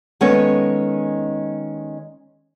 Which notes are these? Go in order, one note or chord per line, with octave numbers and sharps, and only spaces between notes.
D#3 G#3 B3 C#4 A4 C#5